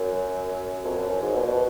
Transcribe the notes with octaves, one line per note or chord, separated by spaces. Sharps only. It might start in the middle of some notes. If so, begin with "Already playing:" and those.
Already playing: F#2
F2
F#2
F#2
G#2
B2
A#2
B2